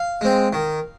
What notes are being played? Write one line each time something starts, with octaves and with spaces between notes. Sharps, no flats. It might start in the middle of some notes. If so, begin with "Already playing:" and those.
Already playing: F5
G#3 C4
D#3